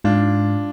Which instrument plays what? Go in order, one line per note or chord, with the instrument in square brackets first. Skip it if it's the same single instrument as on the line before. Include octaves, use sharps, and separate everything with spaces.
[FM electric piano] G#2 [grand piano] D4 F4